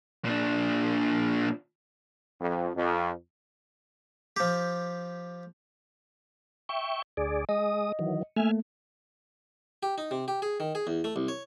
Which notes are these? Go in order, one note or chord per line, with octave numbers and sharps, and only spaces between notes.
A#2 D4
F2
F2
F3 G4
E5 G5 C#6
D2 G#4 D5
G#3 D#5 D#6
D#3 E3 F#3
A3 A#3 E5 G#5 F6
G4
D#4
C3
G4
G#4
D#3
G#4
E2
A3
C2
C#5